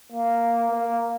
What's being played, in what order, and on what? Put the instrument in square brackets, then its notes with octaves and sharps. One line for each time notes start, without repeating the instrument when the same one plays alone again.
[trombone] A#3
A#3